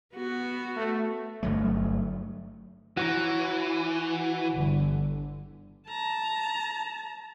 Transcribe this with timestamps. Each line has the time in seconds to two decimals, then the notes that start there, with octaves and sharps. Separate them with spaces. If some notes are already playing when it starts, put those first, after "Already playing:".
0.14 B3 F#4
0.77 A3
1.43 G1 F#3 A3
2.97 E3 F#4 C#5 A#5
4.49 G1 D3
5.87 A5 A#5